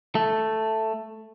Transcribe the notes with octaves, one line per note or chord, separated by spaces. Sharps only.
A3